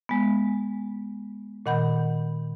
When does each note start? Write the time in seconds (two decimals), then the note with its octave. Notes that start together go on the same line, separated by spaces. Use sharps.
0.09 G#3 B3
1.66 A#2 D#3 F#5 B5 G6